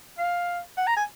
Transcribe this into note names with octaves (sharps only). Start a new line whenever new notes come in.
F5
F#5
A#5
G#5